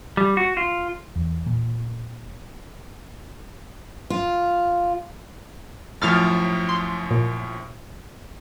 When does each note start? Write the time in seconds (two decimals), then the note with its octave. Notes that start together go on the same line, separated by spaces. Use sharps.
0.17 G3
0.37 F#4
0.57 F4
1.16 E2
1.46 A#2
4.10 F4
6.01 F#2 A2 F3 F6 A6
6.69 C6
7.11 A#2